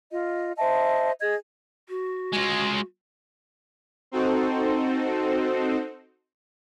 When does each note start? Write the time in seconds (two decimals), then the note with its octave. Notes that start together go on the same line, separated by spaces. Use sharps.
0.11 F4 D#5
0.57 C5 D#5 E5 A5
1.21 G#4 D#5 G#6
1.89 F#4
2.32 G#3 F4
4.12 C4 D#4 F#4 A4 C5